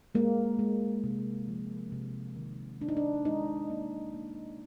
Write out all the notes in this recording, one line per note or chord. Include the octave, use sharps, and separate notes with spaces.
G#3 A#3
G#3
C3
F3
C3
D#3
G#3 D4
D#4
D4
G#3 D#4
A#3
A#3